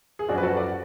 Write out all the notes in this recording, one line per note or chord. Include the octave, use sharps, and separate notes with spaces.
G#4
F#2 D4 F#4
F3 B4
F#4 A4
D5 F#5